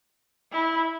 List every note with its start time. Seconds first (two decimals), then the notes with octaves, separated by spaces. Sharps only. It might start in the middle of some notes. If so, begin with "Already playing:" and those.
0.52 E4